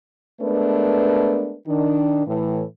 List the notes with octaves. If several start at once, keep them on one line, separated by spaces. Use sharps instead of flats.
G#3 A3 B3 D4 A#4 B4
D#3 D4
A2 E3